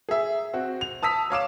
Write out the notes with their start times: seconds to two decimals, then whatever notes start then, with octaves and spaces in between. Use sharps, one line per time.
0.09 G#4 E5
0.53 C4 F#4
0.81 F7
1.02 A5 D#6 E6 B6
1.30 C#5 F5 D6 E7